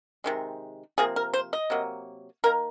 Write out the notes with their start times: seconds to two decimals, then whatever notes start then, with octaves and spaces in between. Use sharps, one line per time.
0.24 C3 D#3 G#3
0.98 C3 F3 A#3 G#4
1.16 A#4
1.34 C5
1.53 D#5
1.70 C3 F#3 A#3
2.44 D#3 A#3 A#4